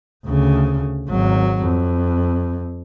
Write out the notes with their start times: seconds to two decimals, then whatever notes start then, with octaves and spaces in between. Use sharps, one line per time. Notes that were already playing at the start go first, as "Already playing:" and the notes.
0.25 D2 C#3
1.09 G#1 F#3
1.63 F2